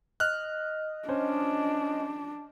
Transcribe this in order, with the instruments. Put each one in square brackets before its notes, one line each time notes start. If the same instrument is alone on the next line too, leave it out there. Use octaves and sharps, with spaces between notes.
[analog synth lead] D#5 [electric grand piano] F6 F#6
[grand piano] C#4 C5 [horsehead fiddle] D4